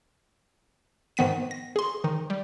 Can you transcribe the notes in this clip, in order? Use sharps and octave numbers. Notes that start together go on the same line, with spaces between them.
G#2 D#3 B3 B6 D#7
A#6
G#4 C6
D#3
G3